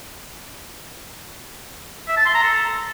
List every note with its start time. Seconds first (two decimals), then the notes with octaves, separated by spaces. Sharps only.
2.08 E5
2.17 A5
2.26 C6
2.34 A#5
2.43 A4